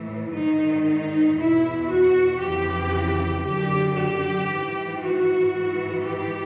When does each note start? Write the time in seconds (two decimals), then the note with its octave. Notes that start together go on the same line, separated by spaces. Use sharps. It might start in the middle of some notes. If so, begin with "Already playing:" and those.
Already playing: A2 E3
0.34 G#2 D#3 D#4
0.86 D#4
1.38 E2 B2 E4
1.90 F#4
2.41 F2 C#3 E3 G4
3.45 F#2 D3 G4
3.96 G4
4.48 G#2 E3
5.00 F#4
5.52 G#2 E3
6.03 G4